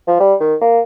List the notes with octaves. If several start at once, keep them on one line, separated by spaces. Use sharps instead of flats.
F3
G3
D#3
A#3